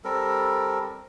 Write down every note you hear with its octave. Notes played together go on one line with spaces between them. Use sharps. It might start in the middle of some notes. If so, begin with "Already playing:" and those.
G3 C4 A4 A#4